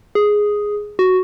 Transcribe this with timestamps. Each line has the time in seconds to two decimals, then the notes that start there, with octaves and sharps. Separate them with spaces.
0.15 G#4
0.99 F#4